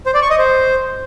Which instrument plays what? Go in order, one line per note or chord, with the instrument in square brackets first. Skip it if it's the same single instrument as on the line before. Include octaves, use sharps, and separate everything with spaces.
[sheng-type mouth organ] C5
D5
C#6
D#5
C5